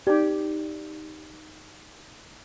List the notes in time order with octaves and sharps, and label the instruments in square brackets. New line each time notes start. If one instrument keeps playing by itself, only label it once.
[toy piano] D#4 D5 [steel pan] G4